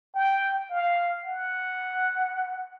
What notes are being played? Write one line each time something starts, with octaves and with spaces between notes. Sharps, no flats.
G5
F5
F#5